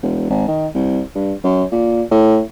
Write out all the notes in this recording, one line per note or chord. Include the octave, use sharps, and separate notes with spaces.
E1
G#1
D#3
C2
G2
F#2
A#2
A2